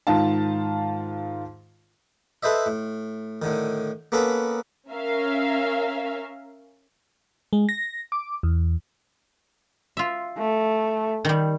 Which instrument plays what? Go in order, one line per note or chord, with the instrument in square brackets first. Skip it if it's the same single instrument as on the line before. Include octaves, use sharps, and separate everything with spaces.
[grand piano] G#2 D#3 F4 F5 A5
[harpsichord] A4 B4 C5 D#5 E5
A2
A2 D3 D#3
A#3 B3 C#4 A4 B4 A#5
[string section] C#4 A#4 E5 F5
[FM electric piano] G#3
A#6
D6
E2
[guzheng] F4 E5
[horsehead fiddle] A3
[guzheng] D#3 G3